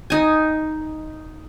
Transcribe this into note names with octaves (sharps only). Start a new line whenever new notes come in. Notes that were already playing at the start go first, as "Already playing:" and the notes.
D#4 G#5